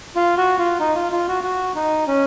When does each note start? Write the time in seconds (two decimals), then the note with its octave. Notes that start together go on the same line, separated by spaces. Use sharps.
0.16 F4
0.37 F#4
0.58 F4
0.80 D#4
0.95 F4
1.12 F4
1.28 F#4
1.43 F#4
1.76 D#4
2.07 C#4